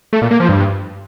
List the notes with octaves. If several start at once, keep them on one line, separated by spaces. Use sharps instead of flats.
A3
A#2
A#3
F3
G2